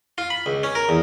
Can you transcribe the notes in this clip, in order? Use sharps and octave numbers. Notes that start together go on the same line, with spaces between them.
F4
B5
C#2
C#4
A#4
E2